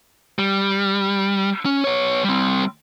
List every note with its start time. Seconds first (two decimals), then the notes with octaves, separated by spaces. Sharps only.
0.39 G3
1.66 C#4
1.84 B3 C#5
2.24 G3 C4